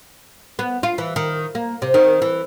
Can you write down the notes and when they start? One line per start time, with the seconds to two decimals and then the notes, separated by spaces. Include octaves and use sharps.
0.59 B3
0.83 F4
0.98 E3
1.16 D#3
1.55 A#3
1.82 C3
1.94 D#3
2.22 E3